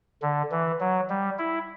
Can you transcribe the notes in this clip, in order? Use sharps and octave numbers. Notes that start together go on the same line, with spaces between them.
D3
E3
F#3
G3
E4